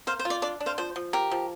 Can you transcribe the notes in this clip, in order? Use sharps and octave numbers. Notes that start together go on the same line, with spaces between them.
A#3 C5 F5
C5
F4
D5
D4 D5
D4
C5 F5
F3 C5
F3
G4 A#4
F3